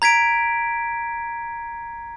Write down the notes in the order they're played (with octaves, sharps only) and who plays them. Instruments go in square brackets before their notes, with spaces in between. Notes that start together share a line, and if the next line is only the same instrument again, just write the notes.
[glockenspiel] A#5 G#6 B6 D7